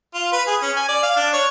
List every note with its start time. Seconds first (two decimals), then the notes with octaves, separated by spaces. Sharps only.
0.14 F4
0.32 B4
0.47 G#4
0.62 C#4
0.77 G#5
0.88 D5
1.03 F5
1.16 D4
1.33 C#5